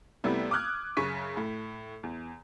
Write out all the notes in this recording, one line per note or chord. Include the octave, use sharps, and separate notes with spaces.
C3 G3 A3 B3 E4
D6 D#6 F6 F#6 G#6
F#2 C#3 C#6 B6 D#7
A2
E2